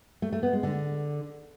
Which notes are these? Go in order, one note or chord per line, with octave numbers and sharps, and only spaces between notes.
A3
A3
B3
G#3
D3